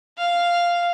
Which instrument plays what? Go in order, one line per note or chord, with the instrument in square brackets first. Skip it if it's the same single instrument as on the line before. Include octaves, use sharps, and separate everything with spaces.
[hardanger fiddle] F5